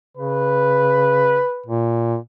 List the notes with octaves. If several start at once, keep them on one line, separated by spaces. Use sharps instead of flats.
C#3 B4
A#2